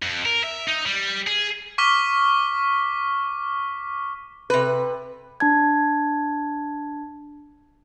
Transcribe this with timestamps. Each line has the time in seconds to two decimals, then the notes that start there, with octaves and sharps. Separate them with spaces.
0.03 F2
0.26 A#4
0.44 E5
0.68 D#4
0.86 G3
1.27 G#4
1.78 C#6 D6 F6 B6 G7
4.50 C3 B4
5.40 D4 A5 G#6